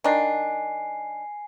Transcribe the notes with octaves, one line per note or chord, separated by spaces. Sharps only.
D#3 D4 G#5 C7